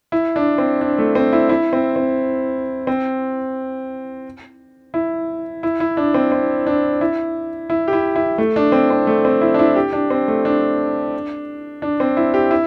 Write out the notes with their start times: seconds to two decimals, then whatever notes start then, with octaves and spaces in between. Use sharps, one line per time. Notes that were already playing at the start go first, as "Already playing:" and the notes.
0.12 E4
0.36 D4
0.58 C4
0.81 D4
0.98 A3
1.15 C4
1.33 E4
1.49 E4
1.73 C4
1.96 C4
2.87 C4
4.94 E4
5.63 E4
5.80 E4
5.97 D4
6.14 C4
6.32 C4
6.67 D4
7.01 E4
7.70 E4
7.88 G4
7.93 E4
8.16 E4
8.38 A3
8.56 D4
8.72 C4
8.90 C4
9.07 A3
9.25 C4
9.42 E4
9.54 D4
9.59 E4
9.76 G4
9.93 D4
10.10 C4
10.28 A3
10.45 D4
11.82 D4
12.00 C4
12.17 E4
12.34 G4
12.51 E4